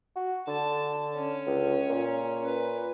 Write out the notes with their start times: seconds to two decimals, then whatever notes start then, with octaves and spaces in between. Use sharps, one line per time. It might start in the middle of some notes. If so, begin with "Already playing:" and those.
0.16 F#4
0.48 D3 A5
1.14 C#4
1.47 C#2
1.90 A#2
2.45 B4